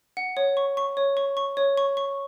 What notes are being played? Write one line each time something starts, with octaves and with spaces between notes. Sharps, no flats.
F#5
C#5
C#6
C#6
C#5
C#6
C#6
C#5
C#6
C#6